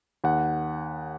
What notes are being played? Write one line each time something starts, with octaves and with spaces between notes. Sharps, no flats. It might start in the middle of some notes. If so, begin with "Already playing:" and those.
D#2 F#5